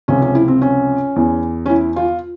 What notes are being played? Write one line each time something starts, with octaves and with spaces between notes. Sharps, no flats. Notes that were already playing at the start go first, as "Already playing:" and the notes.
C#2 C3 F3 C#4
C#4
E4
C4
C#4
E2 E3
C#4
E4
F4